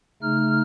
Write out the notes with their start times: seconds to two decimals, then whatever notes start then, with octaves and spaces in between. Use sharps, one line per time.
0.22 C#3 A3 D#4 F6